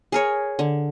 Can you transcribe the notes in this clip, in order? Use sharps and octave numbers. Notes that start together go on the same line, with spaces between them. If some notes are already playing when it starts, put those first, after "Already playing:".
G#4 A#4 C#5
D3